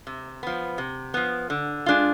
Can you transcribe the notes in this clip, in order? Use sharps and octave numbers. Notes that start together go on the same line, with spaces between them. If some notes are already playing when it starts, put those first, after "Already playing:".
C3
F3 B3
C3
F3 B3
D3
G#3 D4 F4